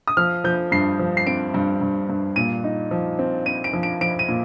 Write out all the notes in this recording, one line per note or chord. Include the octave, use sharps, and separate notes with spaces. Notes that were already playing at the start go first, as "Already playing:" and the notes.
D#6
F3 F6
F3 G6
G2 C7
F3
C7
C4 D7
G2
G2
G2
A#2 D#7
D#4
F3
C4
C4 D#7
D7
F3
D7
F3 D7
D#7
A#2